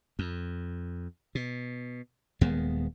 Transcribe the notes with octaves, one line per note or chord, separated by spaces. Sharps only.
F2
B2
D#1 D#2 G#3 B3